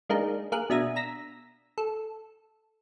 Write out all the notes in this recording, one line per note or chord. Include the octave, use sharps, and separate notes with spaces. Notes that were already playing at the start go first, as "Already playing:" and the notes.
G#3 A#3 D4 D#4 G#4
A#3 G#4 A#4 F#6
B2 D4 E5 A#5 D#6 G#6
A#5 E6 A#6 B6
A4